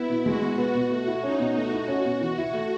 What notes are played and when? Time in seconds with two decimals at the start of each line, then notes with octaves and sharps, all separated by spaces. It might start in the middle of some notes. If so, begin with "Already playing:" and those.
Already playing: B3 E4
0.09 B2
0.25 G#3 F#4
0.42 B2
0.58 B3
0.75 B2
0.90 A3 F#4
1.07 E4
1.23 C#4 D#4
1.39 B2
1.56 A3 F#4
1.72 E4
1.88 C#4
2.05 B2
2.21 E3 F#4
2.38 E4
2.53 A3